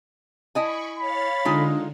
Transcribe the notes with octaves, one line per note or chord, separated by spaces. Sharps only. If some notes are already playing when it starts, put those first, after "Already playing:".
E4 D#5 G#5 B5 C#6
C#5 F5 B5 A6
D3 G#3 D#4 F4